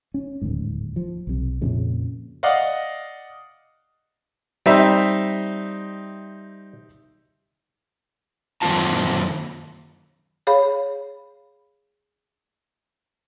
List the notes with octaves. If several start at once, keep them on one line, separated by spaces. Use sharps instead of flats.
C#4
D1 D#2 G#2
F3
B1 C3
F2 A#2 C#3
D5 D#5 F5 F#5
G3 C4 D#4 E5
F#2 D#3 A#3 C4 F4 A5
G#4 C#5 F5 B5